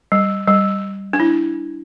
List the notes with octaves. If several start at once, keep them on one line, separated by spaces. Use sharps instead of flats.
G3
G3
D4
E4